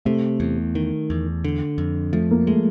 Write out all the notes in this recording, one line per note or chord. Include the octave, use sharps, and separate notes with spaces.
C3 A3
E2
D#3
E2
D3
F2
F3 A3
A#3
G#3 A3